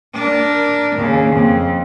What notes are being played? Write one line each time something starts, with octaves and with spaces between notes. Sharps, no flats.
D4 A#4
D#2 C#3
F2